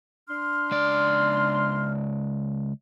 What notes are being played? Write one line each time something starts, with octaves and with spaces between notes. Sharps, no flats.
D4 C6 F6
C#2 D5